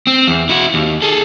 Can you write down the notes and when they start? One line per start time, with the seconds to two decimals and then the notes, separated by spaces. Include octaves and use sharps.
0.07 C4
0.27 E2
0.49 E4 F#4
0.74 D#2
1.02 G#4 A4